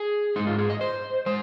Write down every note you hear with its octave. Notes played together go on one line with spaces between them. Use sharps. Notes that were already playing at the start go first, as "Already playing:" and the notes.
Already playing: G#4
G#2 G#3 D#4
F4
G#4
D#5
C5
G#3 C5